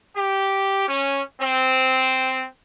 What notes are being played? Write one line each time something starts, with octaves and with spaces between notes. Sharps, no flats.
G4
C#4
C4